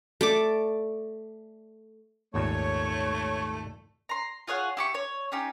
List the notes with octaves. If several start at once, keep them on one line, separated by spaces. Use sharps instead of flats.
A3 D5 D6
G#1 D#2 A#2 A3 C#5 C#6
A#5 C6
F4 G#4 C#5 F#5
E4 G4 C#6
C#5
C#4 D#4 G4